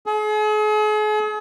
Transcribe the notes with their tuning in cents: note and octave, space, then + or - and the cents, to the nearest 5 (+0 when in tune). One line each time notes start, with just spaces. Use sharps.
G#4 +40